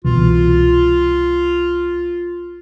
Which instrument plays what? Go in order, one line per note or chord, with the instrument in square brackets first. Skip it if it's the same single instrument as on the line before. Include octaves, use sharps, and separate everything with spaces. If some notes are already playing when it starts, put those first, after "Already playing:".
[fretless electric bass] C2 B2 E3 [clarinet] F4